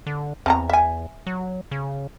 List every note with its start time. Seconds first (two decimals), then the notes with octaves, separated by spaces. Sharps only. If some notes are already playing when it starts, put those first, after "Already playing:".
0.07 D3
0.46 E2 C4 A5 A#5
0.70 E5 G#5
1.27 F#3
1.71 C#3